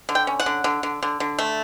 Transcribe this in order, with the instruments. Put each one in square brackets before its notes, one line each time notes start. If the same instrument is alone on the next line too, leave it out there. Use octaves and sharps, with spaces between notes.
[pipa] D3
G5
C#4
F#5
D3
D3
D3
D3
D3
A3